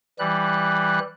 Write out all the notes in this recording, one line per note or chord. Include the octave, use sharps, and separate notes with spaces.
E3 G3 F#6